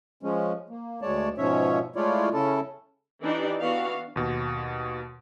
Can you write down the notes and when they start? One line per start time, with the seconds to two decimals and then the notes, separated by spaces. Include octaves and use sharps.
0.23 F3 G#3 C#4
0.69 A#3
1.02 D2 G#3 C#5 D5 A5
1.38 G#2 B2 F3 C#4 C#5 E5
1.96 G#3 A3 E4 F4 C#5 D5
2.34 C#3 C#4 E4 A4 A5
3.22 E3 D4 D#4 G4 D5
3.61 E3 B3 D4 F#4 F5
4.16 D#2 B2